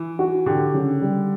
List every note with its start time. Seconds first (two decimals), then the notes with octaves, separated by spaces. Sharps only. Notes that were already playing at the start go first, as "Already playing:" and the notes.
Already playing: E3
0.19 F#4
0.46 D3 G4
0.74 C#3
1.02 G3